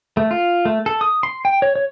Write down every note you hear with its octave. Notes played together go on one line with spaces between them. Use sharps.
A3
F4
A3
A4
D#6
C6
G5
C#5
C#5